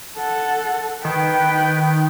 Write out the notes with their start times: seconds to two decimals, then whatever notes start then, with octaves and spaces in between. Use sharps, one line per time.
0.17 A4 F#5
1.05 D#3 B4 G5